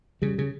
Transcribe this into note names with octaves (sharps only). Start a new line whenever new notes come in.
C#3 G3
C#3